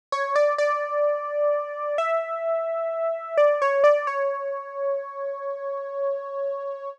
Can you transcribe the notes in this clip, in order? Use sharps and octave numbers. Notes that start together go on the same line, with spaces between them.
C#5
D5
D5
E5
D5
C#5
D5
C#5